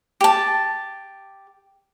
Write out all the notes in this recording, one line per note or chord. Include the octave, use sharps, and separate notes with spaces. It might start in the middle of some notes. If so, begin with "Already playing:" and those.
G4 A5